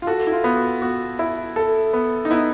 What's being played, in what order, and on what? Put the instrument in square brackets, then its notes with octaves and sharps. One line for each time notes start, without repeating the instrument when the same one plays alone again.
[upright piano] F4
[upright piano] F#4 [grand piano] A4
[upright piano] E4
F4
[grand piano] B3
[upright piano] F#4
[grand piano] B3 [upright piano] F#4
[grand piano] E4
A4
B3
[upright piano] D#4
[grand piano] B3 [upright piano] E4